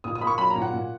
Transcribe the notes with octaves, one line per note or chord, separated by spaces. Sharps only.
A#2 D#6
D#6
A#3 B5
C#6
F#3 B5
A#5
A#2
F#5
A#2